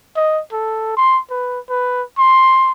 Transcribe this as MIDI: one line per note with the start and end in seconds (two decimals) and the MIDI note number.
0.16 0.41 75
0.52 0.97 69
0.97 1.19 84
1.30 1.59 71
1.69 2.02 71
2.18 2.72 84